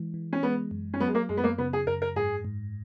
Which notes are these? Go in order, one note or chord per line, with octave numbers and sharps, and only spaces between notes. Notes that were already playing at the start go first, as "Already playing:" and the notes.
Already playing: E3 G#3
E3
C#4
G#3 B3
F#2
C#4
F#3 B3
G#3
A#3
F#2 G#3
B3
A#3
C#3 B3
G#4
F#2 A#4
A#4
G#2 G#4
G#2